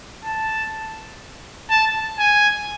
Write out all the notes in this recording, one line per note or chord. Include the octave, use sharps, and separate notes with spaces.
A5
A5
G#5